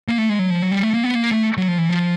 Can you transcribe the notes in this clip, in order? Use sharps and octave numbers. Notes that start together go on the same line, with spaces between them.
A#3
A3
G#3
F#3
F3
F#3
G3
A3
A#3
B3
A#3
A3
F#3
F3
E3
F3